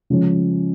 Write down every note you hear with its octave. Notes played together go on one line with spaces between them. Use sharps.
C#3 F3 G#3 C#4